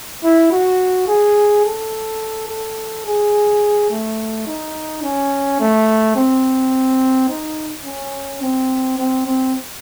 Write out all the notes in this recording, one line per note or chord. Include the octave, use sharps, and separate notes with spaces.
E4
F#4
G#4
A4
A4
G#4
A3
D#4
C#4
A3
C4
D#4
C#4
C4
C4
C4